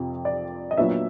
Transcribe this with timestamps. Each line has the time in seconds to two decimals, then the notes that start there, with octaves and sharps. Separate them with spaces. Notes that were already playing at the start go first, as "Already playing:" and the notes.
Already playing: F2 C3 F3
0.25 D5
0.71 D#5
0.77 A#2 F#3 B3 D4 E5